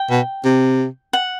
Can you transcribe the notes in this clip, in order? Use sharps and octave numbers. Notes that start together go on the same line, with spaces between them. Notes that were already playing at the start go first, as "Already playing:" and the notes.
Already playing: G5
B2
C3
F#5